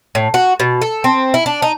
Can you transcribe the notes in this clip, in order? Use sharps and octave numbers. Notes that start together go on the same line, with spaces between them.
A2
F#4
B2
A4
C4
E4
D4
D#4